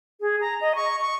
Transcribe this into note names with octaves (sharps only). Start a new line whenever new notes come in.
G#4
A#5
D#5
C#6
C#6